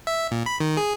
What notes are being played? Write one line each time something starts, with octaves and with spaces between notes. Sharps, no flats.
E5
A#2
B5
D#3
G#4